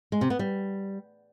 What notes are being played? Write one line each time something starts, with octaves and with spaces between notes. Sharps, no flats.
G#3
C3
B3
G3